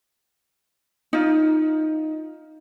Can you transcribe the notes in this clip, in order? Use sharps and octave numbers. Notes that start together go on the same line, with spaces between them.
D#4 F4